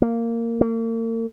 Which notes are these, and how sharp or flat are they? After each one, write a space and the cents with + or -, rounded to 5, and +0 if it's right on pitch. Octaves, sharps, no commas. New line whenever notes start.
A#3 -15
A#3 -40